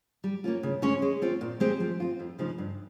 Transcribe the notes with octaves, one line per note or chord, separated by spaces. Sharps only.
G3
A#3 C#4 F4
C#3
G#3 C#4 G#4 C#5
G#3
C4 F4
A#2
G#3 C4 G4
F3
C4 F4
F2
C#3 F3 G#3 D#4
G2